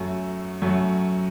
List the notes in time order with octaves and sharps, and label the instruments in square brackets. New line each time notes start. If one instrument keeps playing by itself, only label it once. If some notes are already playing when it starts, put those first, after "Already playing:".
Already playing: [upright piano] F#2 F#3 A3
F#2 F#3 A3